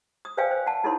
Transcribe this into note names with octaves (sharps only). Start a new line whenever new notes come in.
D#6
B4 C5 D5 F5 G5 G#5
C5
F#5 A5
D#4 E4 A4 A#4 C#5 C6